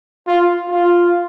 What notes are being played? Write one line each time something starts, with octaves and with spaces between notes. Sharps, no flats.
F4
F4